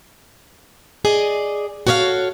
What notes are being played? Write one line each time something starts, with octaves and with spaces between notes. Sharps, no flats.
G#4 D5 D#5
F#4 A4 C#5 D#5 F5